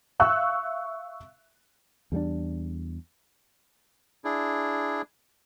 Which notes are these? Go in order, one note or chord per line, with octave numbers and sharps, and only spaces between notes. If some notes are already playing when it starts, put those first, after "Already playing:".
E5 F5 C#6 E6 F#6
E2 G3 G#3 D4
D4 E4 G#4